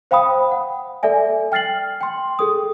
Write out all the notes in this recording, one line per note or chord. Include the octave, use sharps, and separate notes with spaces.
C5 F5 G5 B5 D#6
F#5
A4 D5 E5 G#5
G5 F6 A6 C7 F#7
G5 C6
G#4 A4 D#6